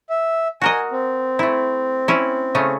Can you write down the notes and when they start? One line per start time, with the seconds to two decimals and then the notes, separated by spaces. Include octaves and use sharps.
0.10 E5
0.61 F#4 A#4 D#5 G#5
0.91 C4
1.39 A3 E4
2.08 C#4 E4
2.55 C#3 A3 C#4